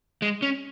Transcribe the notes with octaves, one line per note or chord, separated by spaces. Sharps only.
G#3
C#4